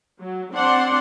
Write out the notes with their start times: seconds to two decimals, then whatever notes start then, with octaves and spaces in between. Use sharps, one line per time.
0.20 F#3
0.53 C4 D4 D5 F#5 C6